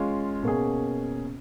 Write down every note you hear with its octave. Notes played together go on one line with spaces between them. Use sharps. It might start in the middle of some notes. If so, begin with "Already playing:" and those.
Already playing: G#3 C#4 F4 G#4
B2 A#3 C#4 G#4